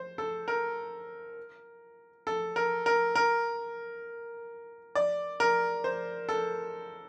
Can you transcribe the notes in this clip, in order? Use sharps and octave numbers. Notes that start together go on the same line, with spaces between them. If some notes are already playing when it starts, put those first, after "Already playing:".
Already playing: C5
A4
A#4
A4
A#4
A#4
A#4
D5
A#4
C5
A4